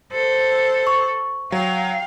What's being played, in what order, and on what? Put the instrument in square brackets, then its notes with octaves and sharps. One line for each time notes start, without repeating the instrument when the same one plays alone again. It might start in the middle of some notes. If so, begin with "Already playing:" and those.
[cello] A4 [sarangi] C5
[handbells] C#6
[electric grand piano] F#3 [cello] F5 [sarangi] G5